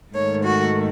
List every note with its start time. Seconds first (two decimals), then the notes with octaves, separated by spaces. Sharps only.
0.14 G#2 D#3 A3 C#5
0.43 F#4